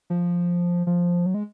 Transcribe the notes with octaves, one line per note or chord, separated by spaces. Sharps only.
F3
F3
F#3
G#3